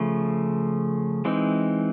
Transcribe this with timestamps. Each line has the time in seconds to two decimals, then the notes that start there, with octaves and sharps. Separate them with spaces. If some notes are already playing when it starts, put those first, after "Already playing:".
Already playing: C#3 F3 A3
1.25 E3 G#3 C4 D#4